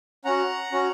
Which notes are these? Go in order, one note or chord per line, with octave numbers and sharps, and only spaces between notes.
C#4 F#4 F#5 A#5
C#4 F#4